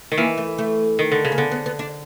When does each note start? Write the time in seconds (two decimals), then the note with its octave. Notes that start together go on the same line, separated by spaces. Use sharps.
0.12 D#3
0.18 E3 A#3
0.37 A3
0.58 A3
0.99 D#3
1.12 D3
1.25 C#3
1.32 A#3
1.38 D3 B3
1.52 B3
1.66 B3
1.79 D4